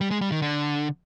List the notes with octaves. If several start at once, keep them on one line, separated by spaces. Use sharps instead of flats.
G3
G#3
G3
D#3
D3